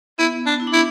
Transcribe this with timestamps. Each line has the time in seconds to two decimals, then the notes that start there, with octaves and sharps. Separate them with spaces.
0.18 B3 E4
0.46 D4
0.60 E4
0.67 D4
0.73 C#4 E4